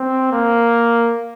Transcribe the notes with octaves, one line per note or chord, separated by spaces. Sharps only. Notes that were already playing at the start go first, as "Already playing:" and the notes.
Already playing: C4
A#3